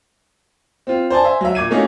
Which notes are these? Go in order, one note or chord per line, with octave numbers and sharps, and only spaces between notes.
C4 F4
C5 D5 G#5 A5
C5 E5 G#5
F#3 E5
A#2 D6 G#6 D#7
A3 A#3 C#4 D#4 E4 F#4